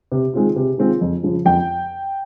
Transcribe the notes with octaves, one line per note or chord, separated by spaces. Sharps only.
C3
D#3 G#3 C4 F4
C3
D#3 G#3 C4 F4
F2
C#3 F3
F2 G5